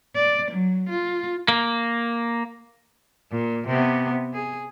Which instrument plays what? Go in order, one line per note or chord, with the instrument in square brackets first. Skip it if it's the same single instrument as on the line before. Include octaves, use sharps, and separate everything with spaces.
[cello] D5
F#3
F4
[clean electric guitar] A#3
[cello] A#2
C3 B3
G#4